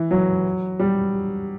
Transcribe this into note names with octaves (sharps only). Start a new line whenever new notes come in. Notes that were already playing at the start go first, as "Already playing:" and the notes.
Already playing: E3
F#3
G3